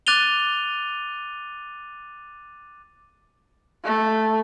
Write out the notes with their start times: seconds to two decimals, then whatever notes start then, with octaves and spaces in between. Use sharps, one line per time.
0.07 D6 F#6 A6 D#7 F7 G7
3.85 A3